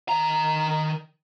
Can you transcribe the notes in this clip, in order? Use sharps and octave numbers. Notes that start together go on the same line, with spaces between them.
D#3 A#5